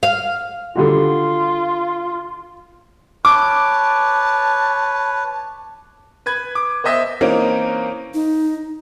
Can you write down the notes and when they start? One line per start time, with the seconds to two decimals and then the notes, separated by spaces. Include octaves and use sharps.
0.03 F5
0.76 D3 G3 F4 F#4
3.25 B4 C#5 A5 D6
6.26 B4 B5 G#6
6.55 D6
6.84 B3 C5 D#5 E5
7.21 E3 A#3 C4 C#4 D#4 A#4
8.14 D#4